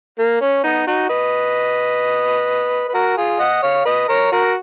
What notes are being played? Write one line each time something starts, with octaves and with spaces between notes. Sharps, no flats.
A#3
C#4
B3 D#4
D#4 F#4
B4 D#5
B4
F#4 A#4
F4 G#4
D#5 F#5
C#5 F5
B4 D#5
A#4 C#5
F#4 A#4